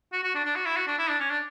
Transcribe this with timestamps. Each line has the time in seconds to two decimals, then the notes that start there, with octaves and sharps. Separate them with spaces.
0.13 F#4
0.23 F#4
0.35 D4
0.45 D4
0.56 F#4
0.66 E4
0.76 F#4
0.87 D4
0.98 E4
1.09 D4
1.20 C#4
1.30 D4